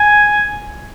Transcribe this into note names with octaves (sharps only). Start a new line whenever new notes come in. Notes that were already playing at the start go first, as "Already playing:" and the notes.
Already playing: G#5